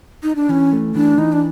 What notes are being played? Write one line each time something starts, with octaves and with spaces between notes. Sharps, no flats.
D#4
D4
E3 C#4
A3
E3 D4
E3 D#4
D4